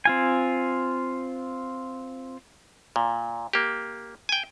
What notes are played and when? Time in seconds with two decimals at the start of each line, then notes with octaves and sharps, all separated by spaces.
0.05 C4 F4 G#5
2.96 A#2
3.53 A#3 G4
4.29 G5 G#5